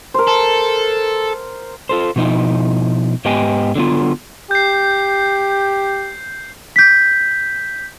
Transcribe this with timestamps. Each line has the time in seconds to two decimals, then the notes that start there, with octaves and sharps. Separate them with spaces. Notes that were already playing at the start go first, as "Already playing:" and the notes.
0.14 A#4 C5
0.27 A4
1.89 F4 A4 C5
2.16 B2 F3 D#4 E4
3.25 G#2 B3 G4 D#5 G5 G#5
3.75 D3 F#3 B3 F4
4.51 G4 G6 C7
6.76 G6 B6